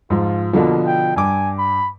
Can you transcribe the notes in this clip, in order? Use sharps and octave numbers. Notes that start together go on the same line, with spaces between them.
G#2 F3 F4
B2 D3 F3 A#3
G5
G2 G#5 D6
B5